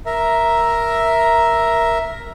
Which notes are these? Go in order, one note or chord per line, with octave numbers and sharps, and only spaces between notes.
A#4 E5 A#5